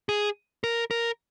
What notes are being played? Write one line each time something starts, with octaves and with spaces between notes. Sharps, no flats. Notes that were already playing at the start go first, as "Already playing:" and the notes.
G#4
A#4
A#4